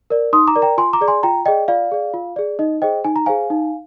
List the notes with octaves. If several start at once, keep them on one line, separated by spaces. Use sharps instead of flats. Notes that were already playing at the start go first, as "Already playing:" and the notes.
A#4 D5
D#4 C6 D#6
A#5 D6
A#4 D5
G5 A#5
F4 G#5 C6
A#5 D6
G#4 D5
G#5 C6
F4 G5 A#5
G#4 D5 D#5 G5
F4 D5 F5
G#4 D5
F4
G#4 D5
D#4 D#5
G#4 C5 D#5 G5
D#4 G#5
A#5
G#4 C5 F5 G#5
D#4